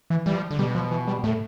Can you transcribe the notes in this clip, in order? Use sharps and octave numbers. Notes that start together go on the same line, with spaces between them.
E3
E3 G3
F3
D3
B2 G3
F3
E3
G3
A2 A3